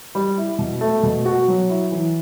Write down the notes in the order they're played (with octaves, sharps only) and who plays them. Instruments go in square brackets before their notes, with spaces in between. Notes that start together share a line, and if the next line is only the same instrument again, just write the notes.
[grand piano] G3
E4
B2
A3
B2
F#4
F#3
E4
E3